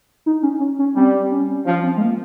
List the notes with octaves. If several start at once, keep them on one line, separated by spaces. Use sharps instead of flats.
D#4
C#4
C#4
C#4
G3 C4
C#4
F3 C#4
C4
G#3
A#3